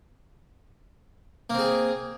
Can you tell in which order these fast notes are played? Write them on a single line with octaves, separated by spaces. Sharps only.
A#3 C4 G#4